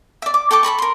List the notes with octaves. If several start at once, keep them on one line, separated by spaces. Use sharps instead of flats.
D5 E5
D6
A4 G5 C#6 D6
A4 A#4 B5 C#6
A#4 C6